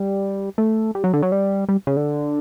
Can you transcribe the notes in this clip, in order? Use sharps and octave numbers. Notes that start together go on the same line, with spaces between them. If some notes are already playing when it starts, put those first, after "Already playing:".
Already playing: G3
A3
G3
F#3
D3
F#3
G3
G3
C#3
D3